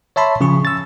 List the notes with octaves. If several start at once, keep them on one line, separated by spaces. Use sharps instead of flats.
C#5 E5 A5 B5 C6
C#3 F3 G#4 C#6
E6 A6